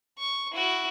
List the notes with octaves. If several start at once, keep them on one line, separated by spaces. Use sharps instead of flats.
C#6
E4 F#4